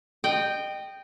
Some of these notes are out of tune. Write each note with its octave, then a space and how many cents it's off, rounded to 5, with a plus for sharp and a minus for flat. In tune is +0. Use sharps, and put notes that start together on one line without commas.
D#5 -25 G5 -5